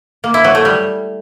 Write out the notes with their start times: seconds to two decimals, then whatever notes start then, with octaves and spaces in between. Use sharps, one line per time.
0.24 A#3
0.34 E4
0.44 F#3
0.55 A3
0.65 G3